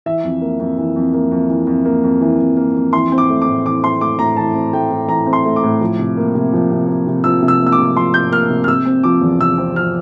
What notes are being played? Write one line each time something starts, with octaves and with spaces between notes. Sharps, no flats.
E3 E5
F2
A#3
F2
E3
F2
A#3
F2
E3
F2
A#3
F2
E3
F2
A#3
F2
E3 C6
C4
D6
A3
D6
A2
E3 D6
C4 C6
A3 D6
A2 A#5
E3 A5
C4
A3 G5
A2
E3 A#5
C4
C6
A3
D6
A2
F3
C3
A#3
C3
F3
C3
A#3
C3
F3 E6
C3
E6
A#3
E6
D6
C3
F3 C6
C3 G6
A#3 F6
C3
F6
C3 E6
C4
F3 D6
E2
C3 E6
C4
F3 F6